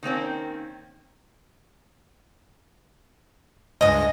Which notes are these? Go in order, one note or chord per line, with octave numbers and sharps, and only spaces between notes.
D#3 A#3 C4 C#4
C#2 G2 G#3 D#5 A#6